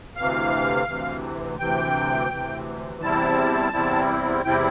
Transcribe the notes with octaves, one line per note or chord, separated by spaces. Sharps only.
D2 C3 E3 F5
D2 C3 E3
D2 C3 E3 G5
D2 C3 E3
E2 C3 G3 C4 E4 A5
E2 C3 G3 C4 E4
E2 C3 G3 C4 E4 G5